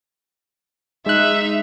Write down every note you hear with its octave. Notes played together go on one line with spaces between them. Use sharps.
G#3 D#4 E5 F#6